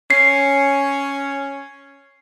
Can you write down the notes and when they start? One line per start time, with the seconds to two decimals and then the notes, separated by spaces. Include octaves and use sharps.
0.10 C#4 C7